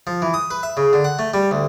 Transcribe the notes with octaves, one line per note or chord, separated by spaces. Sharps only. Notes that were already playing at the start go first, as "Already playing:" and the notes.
F3
E3
D#6
B4
E5
C#3
D3
F#5
A3
G3
D2